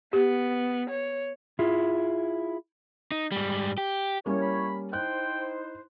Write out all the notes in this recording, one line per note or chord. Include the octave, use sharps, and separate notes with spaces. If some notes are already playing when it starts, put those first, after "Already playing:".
B3 G4
C#5
E4 F4 G#4
D#4
G#2 G3
G4
G3 A#3 C#4 E4 C#5
B5
D#4 E4 C5 G5 F#6